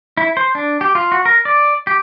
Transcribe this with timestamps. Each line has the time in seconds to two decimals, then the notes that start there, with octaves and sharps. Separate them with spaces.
0.17 E4
0.37 C5
0.55 D4
0.81 G4
0.95 F4
1.12 F#4
1.25 A#4
1.45 D5
1.87 G4